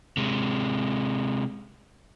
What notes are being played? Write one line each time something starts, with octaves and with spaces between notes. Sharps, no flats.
C3 G#3